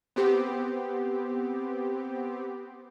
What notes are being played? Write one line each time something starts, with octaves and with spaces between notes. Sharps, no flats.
B3 C4 G4